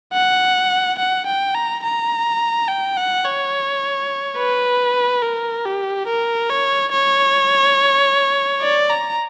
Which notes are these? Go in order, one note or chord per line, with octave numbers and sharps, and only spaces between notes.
F#5
F#5
G5
A#5
A#5
G5
F#5
C#5
B4
A#4
G4
A#4
C#5
C#5
D5
A#5